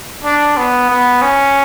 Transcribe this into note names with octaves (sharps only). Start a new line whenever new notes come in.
D4
B3
B3
C#4